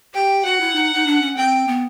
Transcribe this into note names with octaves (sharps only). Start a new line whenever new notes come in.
G4 G5
F#4 F#5
E4
D#4
D#4
D4
C#4
C4 G5
B3